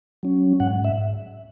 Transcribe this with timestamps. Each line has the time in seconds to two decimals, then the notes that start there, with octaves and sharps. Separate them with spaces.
0.23 F#3 C#4
0.60 G#2 F#5
0.84 E5